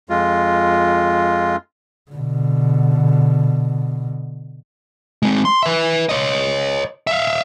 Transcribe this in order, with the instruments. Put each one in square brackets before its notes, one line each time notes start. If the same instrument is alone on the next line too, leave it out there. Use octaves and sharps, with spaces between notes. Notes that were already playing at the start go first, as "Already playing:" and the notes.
[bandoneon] F2 G#3 F4
[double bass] B2 D3
[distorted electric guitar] G#3 C4
C6
B4 E5
C#5 D#5
E5 F5